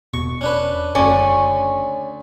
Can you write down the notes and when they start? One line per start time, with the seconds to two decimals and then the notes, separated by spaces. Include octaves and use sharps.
0.14 E1 B2 C#6
0.41 C#4 D4 B4
0.95 F#1 D2 C#4 D5